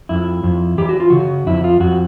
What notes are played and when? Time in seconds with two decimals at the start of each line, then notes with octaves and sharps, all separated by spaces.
0.09 F2 E4
0.43 F2
0.78 E3 G4
0.89 F#4
1.00 F4
1.10 C#3 F#4
1.46 F2 E4
1.64 F4
1.80 F2 F#4